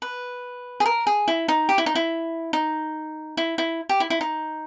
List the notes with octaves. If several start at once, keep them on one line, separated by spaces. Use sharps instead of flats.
B4
G#4
A#4
G#4
E4
D#4
G4
E4
D#4
E4
D#4
E4
E4
G4
E4
E4
D#4